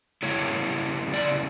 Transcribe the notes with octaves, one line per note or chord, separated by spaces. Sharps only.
C#3 G3 A#3 E4 C#5
D5